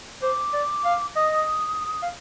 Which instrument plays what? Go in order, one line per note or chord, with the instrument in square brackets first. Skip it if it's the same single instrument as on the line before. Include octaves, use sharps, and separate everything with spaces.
[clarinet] C5 [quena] D6
[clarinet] D5
F5
[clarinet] D#5 [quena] D#6
[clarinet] F5